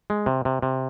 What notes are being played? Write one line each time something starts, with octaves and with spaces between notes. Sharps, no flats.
G#3
C3
C3
C3